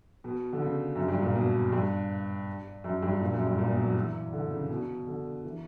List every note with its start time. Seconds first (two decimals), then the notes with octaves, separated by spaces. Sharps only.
0.24 B2
0.53 D3
0.61 C#3
0.95 F#2
1.08 G2
1.22 A#2
1.35 B2
1.72 G2
2.84 F#2
3.03 G2
3.21 A#2
3.34 F#2
3.46 G2
3.58 A#2
3.71 B2
3.83 F#3
3.95 E3
4.33 D3
4.51 C#3
4.70 B2
5.07 D3
5.44 E3